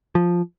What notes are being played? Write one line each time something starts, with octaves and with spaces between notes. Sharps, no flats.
F3